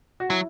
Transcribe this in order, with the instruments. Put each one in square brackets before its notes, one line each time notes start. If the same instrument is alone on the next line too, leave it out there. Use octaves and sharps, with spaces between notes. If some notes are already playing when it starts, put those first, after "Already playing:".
[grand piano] F#4
[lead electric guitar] F#3 [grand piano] E4